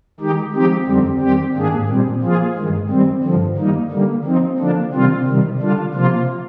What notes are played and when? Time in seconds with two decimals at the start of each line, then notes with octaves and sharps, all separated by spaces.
0.20 D#3 G#3 D#4 G4
0.53 F3 G#3 C4 D#4 G4
0.86 F2 D3 G3 C4
1.20 D#3 G3 C4 G4
1.54 G#2 D#3 A#3 D4 G#4
1.88 A#2 G3 C4
2.22 F3 A#3 F4 G#4
2.55 G2 D#3 G#3
2.90 D#3 G3 C4
3.23 G2 D3 F3
3.57 D#3 G3 A#3 D#4
3.91 D3 G3 A#3
4.25 F3 C4 D#4
4.59 D3 F3 A#3 D4
4.93 C3 D#3 G3 C4 F4
5.26 C3 D#3 G3
5.61 D3 G3 D4 F4
5.94 C3 F3 A#3 F4